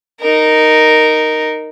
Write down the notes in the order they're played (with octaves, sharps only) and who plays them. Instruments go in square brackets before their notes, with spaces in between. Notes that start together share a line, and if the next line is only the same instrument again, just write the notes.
[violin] D#4 A#4